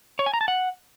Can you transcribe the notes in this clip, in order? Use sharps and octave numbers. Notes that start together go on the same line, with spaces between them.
C#5
G#5
A#5
A5
F#5